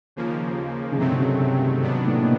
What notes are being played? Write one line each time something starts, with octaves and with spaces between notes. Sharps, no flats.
D#2 C#3 F3 A#3
C#3
G2 C3 D#3 F#3 A3 C4
C3
C#3
C3
G#2 D#3 F#3 B3 D4
A2
A#2
B2